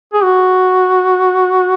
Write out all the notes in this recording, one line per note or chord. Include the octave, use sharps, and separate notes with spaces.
G#4
F#4